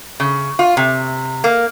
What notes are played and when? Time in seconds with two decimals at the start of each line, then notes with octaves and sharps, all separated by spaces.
0.20 C#3
0.59 F4
0.77 C3
1.44 A#3